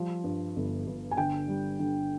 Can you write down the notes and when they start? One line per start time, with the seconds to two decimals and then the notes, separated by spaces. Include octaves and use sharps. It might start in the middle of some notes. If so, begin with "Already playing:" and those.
Already playing: F3 G3
0.24 G2
0.56 G1
0.87 G1
1.11 G#5
1.17 D3 G5
1.48 G3
1.79 D3